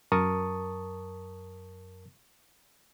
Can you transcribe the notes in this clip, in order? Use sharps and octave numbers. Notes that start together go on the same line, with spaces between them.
F#2 A#4 A5 C#6 D#6